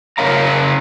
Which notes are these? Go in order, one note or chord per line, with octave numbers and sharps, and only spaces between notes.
C#3 C#4 A#4 C#5 F5 A#5